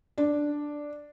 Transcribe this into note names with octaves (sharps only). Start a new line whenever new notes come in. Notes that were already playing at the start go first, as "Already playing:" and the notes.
D4